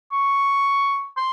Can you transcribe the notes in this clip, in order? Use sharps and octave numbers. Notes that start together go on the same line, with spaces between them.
C#6
C6